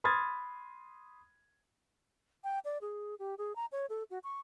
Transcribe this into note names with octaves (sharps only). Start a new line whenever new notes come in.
B5 C6 D#6 F6 G#6 A6
G5
D5
G#4
G4
G#4
A#5
C#5
A4
F#4
C#6